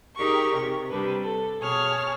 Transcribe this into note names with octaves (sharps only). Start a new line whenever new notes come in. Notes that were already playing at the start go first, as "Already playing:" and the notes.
D#4 G4 G#4 A#4 C#6
C3
C3 G3 D4 B4
A4
B2 G#4 C#5 A5 F6